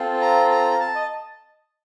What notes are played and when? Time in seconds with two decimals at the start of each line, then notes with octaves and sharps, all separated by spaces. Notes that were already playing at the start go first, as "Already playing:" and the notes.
Already playing: C4 F4 A4
0.21 A#5
0.51 A#5
0.80 A5
0.95 D#5